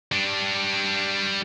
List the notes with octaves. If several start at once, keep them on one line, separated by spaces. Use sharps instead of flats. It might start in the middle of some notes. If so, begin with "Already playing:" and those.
G3 D4